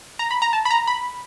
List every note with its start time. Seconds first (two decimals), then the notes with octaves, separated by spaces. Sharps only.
0.19 A#5
0.31 B5
0.42 A#5
0.53 A5
0.65 B5
0.71 A#5
0.87 B5